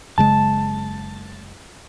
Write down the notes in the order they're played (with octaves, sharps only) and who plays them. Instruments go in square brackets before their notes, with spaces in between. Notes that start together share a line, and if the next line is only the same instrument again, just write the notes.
[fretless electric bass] F#1 C#3 G#3 [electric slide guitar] A5